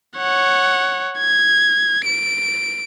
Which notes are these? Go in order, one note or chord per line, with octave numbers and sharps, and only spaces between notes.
C#5 F#5
G#6
D7